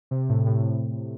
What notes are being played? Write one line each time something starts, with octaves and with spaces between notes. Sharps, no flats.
C3
A2
A2